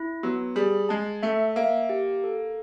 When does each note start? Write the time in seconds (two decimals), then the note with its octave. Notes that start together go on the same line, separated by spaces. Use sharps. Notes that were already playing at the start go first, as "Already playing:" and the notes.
Already playing: E4
0.23 F#3 B3
0.56 G3 G#4
0.89 G#3 A5
1.23 A3 E5
1.56 A#3 E5
1.89 G4
2.24 A4